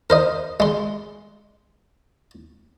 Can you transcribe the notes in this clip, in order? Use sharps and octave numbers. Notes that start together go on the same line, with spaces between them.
A#4 C5 D#5
G#3 C6